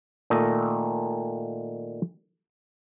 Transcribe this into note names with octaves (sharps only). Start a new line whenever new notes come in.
A#2 D#3 A3 D#5